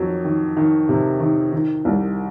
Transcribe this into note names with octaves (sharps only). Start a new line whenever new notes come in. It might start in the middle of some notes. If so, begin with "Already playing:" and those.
Already playing: F2 D#3 F#3
D#3
D#3
C3
D#3
D#3
C2